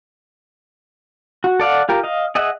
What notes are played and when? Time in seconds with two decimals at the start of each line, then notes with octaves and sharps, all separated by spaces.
1.44 F#4
1.60 A4 D5 F5 F#5
1.89 F4 G4 A#4
2.03 D#5 F5
2.35 G#4 D#5 E5 F#5